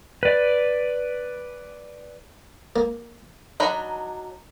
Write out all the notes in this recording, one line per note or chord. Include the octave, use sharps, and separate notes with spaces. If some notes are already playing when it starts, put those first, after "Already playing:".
B4 D5
A#3
F#3 D4 D#4 A#5 B5